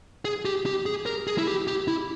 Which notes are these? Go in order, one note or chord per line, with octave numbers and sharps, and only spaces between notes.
G#4
G4
G4
G#4
A#4
G#4
E4
G4
G4
E4